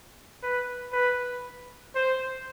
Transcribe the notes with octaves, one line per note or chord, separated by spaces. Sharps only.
B4
B4
C5